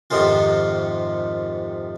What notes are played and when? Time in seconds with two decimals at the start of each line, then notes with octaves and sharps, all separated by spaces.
0.10 F2 G#2 C3 D#3 F4